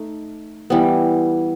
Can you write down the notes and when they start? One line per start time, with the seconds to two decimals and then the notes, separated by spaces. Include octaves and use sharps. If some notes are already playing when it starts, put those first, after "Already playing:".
Already playing: A3 D#4
0.70 E3 G3 B3